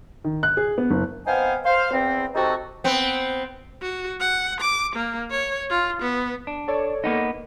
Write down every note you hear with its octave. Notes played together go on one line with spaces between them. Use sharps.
D#3
F#6
G#4
B3
F#1
B3 C4 D#4 C5 F5 G#5
C5 F5
E2 C4
C3 C4 D#4 F#4 A4
B3 C4
F#4
F#5
D6
A#3
C#5
F4
B3
D4
A4 C#5 D5
A#3 B3 D#4